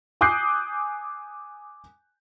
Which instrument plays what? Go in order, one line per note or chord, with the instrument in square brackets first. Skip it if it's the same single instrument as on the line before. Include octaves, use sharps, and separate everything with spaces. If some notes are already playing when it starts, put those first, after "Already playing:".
[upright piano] G#5 D6 D#6 F#6 G6 C7